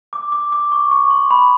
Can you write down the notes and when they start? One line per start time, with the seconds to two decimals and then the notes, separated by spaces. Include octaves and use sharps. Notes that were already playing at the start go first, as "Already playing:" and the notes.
0.13 D6
0.32 D6
0.52 D6
0.72 C#6
0.92 C#6
1.10 C6
1.31 B5